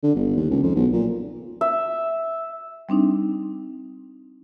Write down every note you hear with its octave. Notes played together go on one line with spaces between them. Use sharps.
D3
G1
D#2
C#2
F2
B1
A#2
E5
G3 C4 D4 D#4